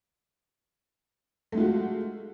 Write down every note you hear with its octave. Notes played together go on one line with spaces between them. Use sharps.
G#3 A3 F4 F#4